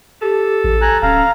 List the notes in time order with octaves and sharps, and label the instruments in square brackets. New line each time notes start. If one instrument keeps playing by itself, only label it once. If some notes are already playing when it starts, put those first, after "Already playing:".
[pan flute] G4 [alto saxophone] A4
[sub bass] A1
[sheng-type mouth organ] G#5 A#5 F#6
[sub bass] D1 [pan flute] C#4 [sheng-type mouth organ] F5 A#5